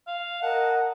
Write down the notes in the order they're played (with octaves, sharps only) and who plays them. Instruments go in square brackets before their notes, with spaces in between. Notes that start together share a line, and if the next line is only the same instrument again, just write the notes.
[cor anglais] F5
[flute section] A#4 D#5 A5 [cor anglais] F#5